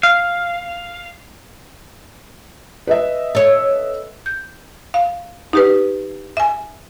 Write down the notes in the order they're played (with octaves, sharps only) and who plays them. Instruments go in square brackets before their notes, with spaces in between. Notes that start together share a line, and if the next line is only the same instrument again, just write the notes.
[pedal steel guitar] F5
[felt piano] B4 D#5 E5
[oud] A4 C#5
[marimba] G6
F5
D#4 G4 B4
E5 G#5